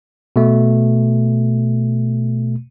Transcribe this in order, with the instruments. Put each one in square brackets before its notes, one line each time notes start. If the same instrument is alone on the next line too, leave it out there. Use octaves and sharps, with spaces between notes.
[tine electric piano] B2 A3